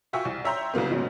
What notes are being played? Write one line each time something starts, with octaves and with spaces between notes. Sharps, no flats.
F4 F#4 E5 G5 G#5 C#6
C2
C#5 E5 G5 A#5 C6 G6
C2 C#3 F#3 A#3 B3
G#2 B2 F#3 C#4